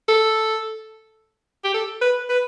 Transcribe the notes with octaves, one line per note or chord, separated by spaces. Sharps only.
A4
G4
A4
B4
B4